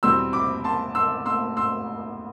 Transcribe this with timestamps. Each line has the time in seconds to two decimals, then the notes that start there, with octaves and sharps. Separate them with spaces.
0.03 E2 B2 G3 C4 C6 E6
0.33 B5 D6
0.64 A5 C6
0.95 C6 E6
1.26 C6 E6
1.57 C6 E6